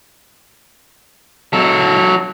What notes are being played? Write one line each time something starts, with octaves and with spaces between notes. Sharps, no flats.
F#3 A4